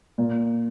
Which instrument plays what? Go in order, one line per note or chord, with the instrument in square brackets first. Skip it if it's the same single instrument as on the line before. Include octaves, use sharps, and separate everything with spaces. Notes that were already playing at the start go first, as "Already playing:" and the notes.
[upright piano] A#2